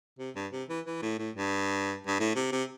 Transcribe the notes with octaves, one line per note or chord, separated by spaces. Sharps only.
C3
G2
C3
E3
E3
A2
A2
G2
G2
A2
C3
C3